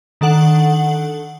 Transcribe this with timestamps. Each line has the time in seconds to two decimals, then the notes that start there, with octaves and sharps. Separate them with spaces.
0.21 D#3 D4 A4 F#5 F#7